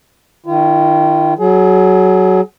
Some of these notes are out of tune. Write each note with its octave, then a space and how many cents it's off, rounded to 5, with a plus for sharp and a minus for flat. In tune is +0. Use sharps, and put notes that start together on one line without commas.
D#3 +0 F4 -40
F#3 +10 G#4 +30